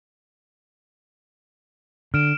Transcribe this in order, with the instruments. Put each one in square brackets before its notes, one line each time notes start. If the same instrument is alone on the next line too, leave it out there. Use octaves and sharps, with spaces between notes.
[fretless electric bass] D3 [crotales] F6 D7 E7